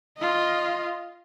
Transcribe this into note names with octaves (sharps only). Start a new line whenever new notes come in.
F4 D#5